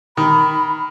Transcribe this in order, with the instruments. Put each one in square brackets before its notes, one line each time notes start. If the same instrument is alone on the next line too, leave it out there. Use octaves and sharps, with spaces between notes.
[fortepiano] D#3 [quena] B5